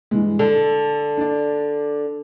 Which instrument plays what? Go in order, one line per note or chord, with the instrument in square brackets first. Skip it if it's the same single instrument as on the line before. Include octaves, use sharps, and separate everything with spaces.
[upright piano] G2 E3 G#3
[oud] D3 [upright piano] A4
[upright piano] D4 D5